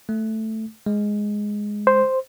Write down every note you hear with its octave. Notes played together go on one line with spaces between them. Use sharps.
A3
G#3
C5